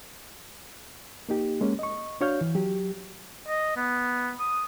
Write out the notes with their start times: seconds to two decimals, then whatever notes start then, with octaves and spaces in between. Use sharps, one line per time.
1.29 A#3 D#4 G4
1.61 G#3 A#3 C#4
1.79 D#5 C#6
2.21 D4 F#4 C#5 F5 F6 G6
2.41 E3
2.55 F#3 G4
3.48 D#5
3.77 B3
4.40 D#6